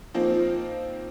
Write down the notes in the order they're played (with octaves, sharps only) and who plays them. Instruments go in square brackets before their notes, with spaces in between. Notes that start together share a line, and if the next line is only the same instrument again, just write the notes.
[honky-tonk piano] F3 A#3 C4 D#4